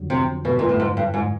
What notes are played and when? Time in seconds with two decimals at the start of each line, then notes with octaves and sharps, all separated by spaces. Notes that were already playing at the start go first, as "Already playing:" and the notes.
Already playing: F2 D3 F#3
0.10 C3
0.45 B2
0.59 A#2
0.69 A2
0.80 G#2
0.97 G2
1.14 G#2